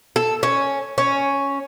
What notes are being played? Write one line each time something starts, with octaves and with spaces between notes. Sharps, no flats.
A4
C#4
C#4